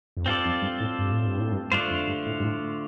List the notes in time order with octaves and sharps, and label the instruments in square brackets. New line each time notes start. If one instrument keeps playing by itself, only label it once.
[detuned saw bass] F2
[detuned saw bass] G2 [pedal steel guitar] C4 F4 A4 D5
[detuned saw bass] F2
G2
A2
G2
A2
G2
A2
G2
[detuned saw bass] G2 [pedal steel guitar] D3 A3 D4 F4 C5
[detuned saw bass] F2
G2
A2
G2
A2